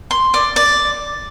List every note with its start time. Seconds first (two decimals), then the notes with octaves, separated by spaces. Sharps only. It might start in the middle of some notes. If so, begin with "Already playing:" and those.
0.11 C6
0.34 D5
0.56 D5